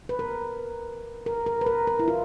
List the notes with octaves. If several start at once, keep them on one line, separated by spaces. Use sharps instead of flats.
B4
A#4
A#4
A#4
B4
A#4
A#4
E4
F4